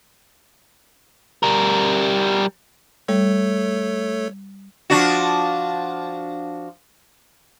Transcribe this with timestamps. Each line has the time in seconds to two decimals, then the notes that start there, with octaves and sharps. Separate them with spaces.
1.43 G3 A#4
3.08 G3 A3 A4 C#5
4.90 F3 D4 F#4